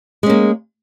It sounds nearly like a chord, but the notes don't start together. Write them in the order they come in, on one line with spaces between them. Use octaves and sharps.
G#3 C#4 A#3